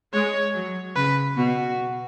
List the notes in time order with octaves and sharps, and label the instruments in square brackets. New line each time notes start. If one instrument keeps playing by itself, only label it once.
[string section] G#3 [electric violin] C#5
[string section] F#3
[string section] C#3 [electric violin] B4
[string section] B2 [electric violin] F#4